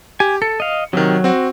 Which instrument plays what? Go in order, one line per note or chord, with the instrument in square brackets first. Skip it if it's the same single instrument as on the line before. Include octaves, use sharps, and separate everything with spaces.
[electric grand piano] G4 [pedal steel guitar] G#5
[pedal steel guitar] A4 [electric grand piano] C#7
[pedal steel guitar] D#5 F5
[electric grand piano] C3 D#3 [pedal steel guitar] F#3
[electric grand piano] C4 F#4